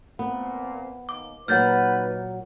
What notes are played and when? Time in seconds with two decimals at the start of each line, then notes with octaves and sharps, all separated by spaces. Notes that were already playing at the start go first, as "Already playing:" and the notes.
0.19 A#2 B3 C4
1.09 D#2 D6
1.48 A#2 F#3 D#4 B4 F#5 F6 G6 A6